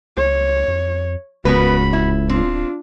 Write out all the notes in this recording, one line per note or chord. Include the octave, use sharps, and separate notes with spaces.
C#2 C#5
F2
D1 C#2 B3 F#4 A#4 B4 B5
E4
C4 D4 F4